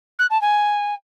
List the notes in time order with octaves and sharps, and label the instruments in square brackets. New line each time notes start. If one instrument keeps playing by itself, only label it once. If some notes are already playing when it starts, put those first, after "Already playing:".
[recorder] F#6
A5
G#5